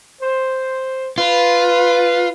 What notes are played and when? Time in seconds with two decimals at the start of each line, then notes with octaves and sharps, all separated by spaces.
0.21 C5
1.18 F4 B4